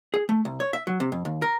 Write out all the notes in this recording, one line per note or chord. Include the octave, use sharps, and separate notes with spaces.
G#4
A3
C2
C#5
E5
F#3
C3
F2
D#2
A#4